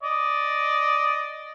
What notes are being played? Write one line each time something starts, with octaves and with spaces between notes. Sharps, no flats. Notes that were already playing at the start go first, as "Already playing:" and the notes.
D5 D#5